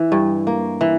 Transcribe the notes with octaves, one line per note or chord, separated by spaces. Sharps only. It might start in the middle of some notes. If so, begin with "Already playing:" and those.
Already playing: E3
G2
A#3
E3